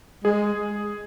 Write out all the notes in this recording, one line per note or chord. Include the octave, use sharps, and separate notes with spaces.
G#3 G#4